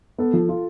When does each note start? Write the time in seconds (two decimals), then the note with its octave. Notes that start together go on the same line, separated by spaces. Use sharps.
0.18 B3 A4
0.33 F3
0.49 F4